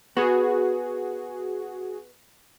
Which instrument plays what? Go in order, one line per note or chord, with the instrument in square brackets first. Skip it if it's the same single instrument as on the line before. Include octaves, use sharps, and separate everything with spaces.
[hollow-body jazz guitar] B3 [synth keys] F#4 G#4